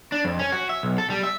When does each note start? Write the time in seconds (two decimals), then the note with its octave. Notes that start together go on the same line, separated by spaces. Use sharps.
0.12 D4
0.25 F2
0.39 C#4
0.52 F#4
0.69 E5
0.83 B1
0.98 A4
1.10 G3
1.23 E5